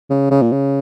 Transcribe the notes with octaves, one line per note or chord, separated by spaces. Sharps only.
C#3
C#3
A#2
C#3